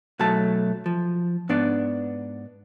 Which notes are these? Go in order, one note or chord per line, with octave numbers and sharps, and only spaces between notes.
B1 F#3 A3 A5
F3
G#2 B3 D4 D5